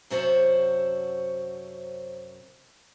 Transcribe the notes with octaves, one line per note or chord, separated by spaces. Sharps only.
F#2 C3 F#4 C5 C#5 A5